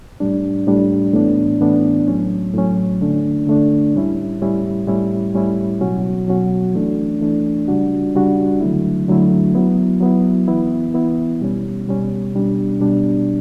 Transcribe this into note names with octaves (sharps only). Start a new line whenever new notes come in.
A2 G3 D4
A2 G3 D4
A2 E3 B3 D4
A2 E3 B3 D4
A2 F#3 C#4
A2 F#3 C#4
D3 A3 D4
D3 A3 D4
A2 G3 C#4 E4
A2 G3 C#4 E4
A2 G3 C#4 E4
A2 G3 C#4 E4
B2 F#3 C#4 F#4
B2 F#3 C#4 F#4
E3 A3 D4
E3 A3 D4
C#3 G3 D4 F#4
C#3 G3 D4 F#4
D3 F#3 A3 E4
D3 F#3 A3 E4
F#3 B3 E4
F#3 B3 E4
E3 B3 E4
E3 B3 E4
B2 G3 C#4
B2 G3 C#4
B2 G3 D4
B2 G3 D4